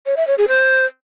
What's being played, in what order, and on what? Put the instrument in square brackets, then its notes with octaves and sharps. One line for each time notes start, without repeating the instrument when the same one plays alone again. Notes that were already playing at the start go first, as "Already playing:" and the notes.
[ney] C#5
E5
C#5
G#4
C5